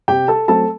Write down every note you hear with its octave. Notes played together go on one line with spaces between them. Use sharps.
C3 G4 G5
A4 A5
F#3 A3 C4 A4 A5